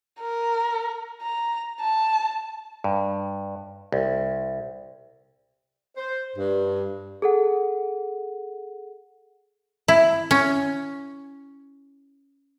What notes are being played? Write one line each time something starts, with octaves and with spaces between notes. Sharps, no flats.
A#4
A#5
A5
G2
C2
C5
G2
G#4 A4 F#5
E4
C#4